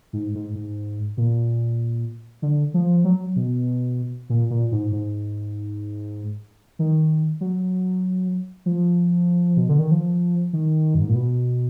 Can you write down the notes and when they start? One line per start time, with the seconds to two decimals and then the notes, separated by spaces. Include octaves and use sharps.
0.13 G#2
0.35 G#2
0.55 G#2
1.17 A#2
2.42 D3
2.74 F3
3.04 F#3
3.36 B2
4.30 A#2
4.50 A#2
4.72 G#2
4.92 G#2
6.79 D#3
7.41 F#3
8.66 F3
9.57 B2
9.69 D3
9.79 D#3
9.91 F3
10.53 D#3
10.95 F#2
11.01 G#2
11.09 A#2
11.15 B2